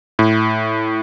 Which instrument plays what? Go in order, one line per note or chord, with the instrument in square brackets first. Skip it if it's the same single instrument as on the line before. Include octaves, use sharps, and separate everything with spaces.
[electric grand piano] A2